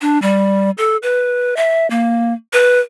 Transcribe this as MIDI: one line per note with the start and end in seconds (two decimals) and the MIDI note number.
0.01 0.21 62
0.22 0.71 55
0.78 0.97 69
1.03 1.56 71
1.56 1.88 76
1.90 2.33 58
2.53 2.80 71